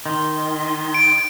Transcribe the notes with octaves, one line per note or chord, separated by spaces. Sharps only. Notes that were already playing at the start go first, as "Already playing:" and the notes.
D#3 C6
D7